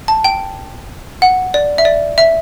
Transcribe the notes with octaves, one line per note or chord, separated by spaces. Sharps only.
A5
G5
F#5
D5
E5
D5
E5